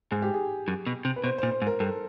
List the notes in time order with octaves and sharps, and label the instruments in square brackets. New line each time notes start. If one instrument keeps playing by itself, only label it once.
[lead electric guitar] G#2 [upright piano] G#4
[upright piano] G4
G#4
[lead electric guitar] F#2
B2
C3
[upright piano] B4
[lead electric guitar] B2 [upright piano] C5
[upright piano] C5
[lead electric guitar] A#2
[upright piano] C5
[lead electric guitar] G#2
[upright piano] A#4
[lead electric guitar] G2 [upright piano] A4